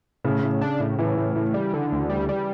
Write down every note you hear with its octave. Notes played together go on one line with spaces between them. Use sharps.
A2 C#3
A2
D4
A2
A2 E3
A2
A2
G3
D3
D2
G3
G3